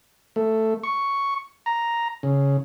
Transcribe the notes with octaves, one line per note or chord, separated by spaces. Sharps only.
A3
C#6
A#5
C#3